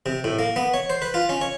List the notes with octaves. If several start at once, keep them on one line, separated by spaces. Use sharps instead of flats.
C3
A2
A#3
B3
C#5
C5
B4
F4
C#4
C#5